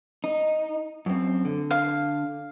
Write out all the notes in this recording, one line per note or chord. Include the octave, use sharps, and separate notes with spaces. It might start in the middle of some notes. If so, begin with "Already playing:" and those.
D#4
F#2 C4
D3
F5